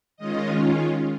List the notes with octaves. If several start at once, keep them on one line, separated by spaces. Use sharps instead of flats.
D#3 G#3 C#4 F4 D#5